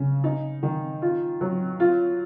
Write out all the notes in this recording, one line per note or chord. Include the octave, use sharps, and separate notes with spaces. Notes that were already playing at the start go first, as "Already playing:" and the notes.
Already playing: C#3
D#4
D#3
F4
F#3
F4